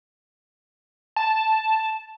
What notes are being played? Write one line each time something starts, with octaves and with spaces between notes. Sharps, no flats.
A5